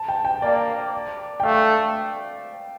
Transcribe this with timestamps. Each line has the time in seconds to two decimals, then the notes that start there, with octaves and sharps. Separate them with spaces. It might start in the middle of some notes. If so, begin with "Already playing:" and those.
Already playing: A5
0.08 G5
0.25 G5
0.42 A#3 D5
1.40 G5
1.43 A3 F5